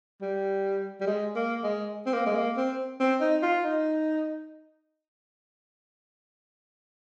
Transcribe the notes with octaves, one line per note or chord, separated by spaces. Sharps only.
G3
G3
G#3
A#3
G#3
C4
A#3
G#3
A#3
C4
C4
D#4
F4
D#4